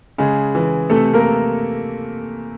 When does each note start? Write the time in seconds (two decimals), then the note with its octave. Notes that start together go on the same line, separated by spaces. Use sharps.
0.18 C#3 G#3 G#4
0.55 E3
0.90 C3 A3 A4
1.13 A#3 A#4